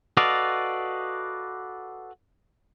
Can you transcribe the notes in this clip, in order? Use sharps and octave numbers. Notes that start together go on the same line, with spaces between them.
F#4 A4 B4 D5 D#5 F5